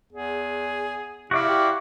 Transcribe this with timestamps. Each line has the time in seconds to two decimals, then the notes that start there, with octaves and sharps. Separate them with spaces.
0.13 E2 G#4
1.31 C3 E4 F#4 D5 F5
1.49 G4